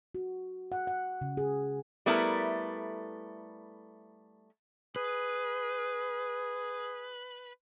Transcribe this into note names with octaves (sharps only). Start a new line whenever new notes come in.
F#4
F#5
F#5
C#3
G#4
G3 A3 B3 E4 A#4
G#4 B4